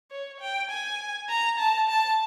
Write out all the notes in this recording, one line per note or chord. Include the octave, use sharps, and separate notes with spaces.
C#5
G5
G#5
A#5
A5
A5